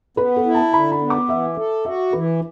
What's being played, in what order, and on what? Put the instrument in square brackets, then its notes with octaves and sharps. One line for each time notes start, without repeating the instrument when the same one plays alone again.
[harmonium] B3 [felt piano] B4
[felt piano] A4
[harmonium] E4
[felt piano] A5
[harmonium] D3 [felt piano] B5
[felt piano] B5
[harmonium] B3
[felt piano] D6
[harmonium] E3 [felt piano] E5
[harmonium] A4
[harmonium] F#4 [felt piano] E5
[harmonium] E3 [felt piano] B4